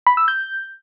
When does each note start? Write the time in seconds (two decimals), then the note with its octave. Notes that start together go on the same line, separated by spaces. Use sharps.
0.07 B5
0.17 E6
0.28 G6